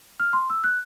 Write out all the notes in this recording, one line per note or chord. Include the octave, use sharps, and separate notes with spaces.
F6
C6
E6
F#6